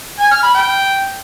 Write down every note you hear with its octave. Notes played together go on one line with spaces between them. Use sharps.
G#5
F6
B5
G5